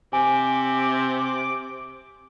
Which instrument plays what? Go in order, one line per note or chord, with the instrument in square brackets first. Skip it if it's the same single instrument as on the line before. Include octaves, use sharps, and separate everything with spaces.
[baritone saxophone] C3 [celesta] G#5 [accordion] D6